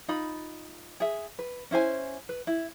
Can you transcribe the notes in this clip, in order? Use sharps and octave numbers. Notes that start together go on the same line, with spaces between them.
D#4 F4 B5
G#4 E5
B4
C#4 E4 C5 G#5
B4
E4